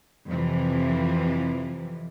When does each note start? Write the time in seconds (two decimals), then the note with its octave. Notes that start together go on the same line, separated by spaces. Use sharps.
0.27 F2 C3 E3 F3